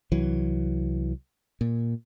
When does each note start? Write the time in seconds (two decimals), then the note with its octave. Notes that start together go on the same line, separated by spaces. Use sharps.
0.12 C2 E3 F#3
1.61 A#2